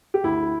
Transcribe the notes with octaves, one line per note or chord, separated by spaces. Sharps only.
G4
D2 E4